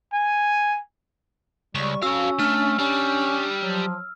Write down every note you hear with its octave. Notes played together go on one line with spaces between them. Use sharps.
G#5
C#2 G3 C#6
C#4 F#4 A4 F5 E6
A3 D4 F6
G3 C#4
F3 F#3